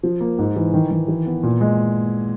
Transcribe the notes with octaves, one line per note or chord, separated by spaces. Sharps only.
F3
A#3
G#2
E3
D#3
D#3
E3
B3
A#2
G#3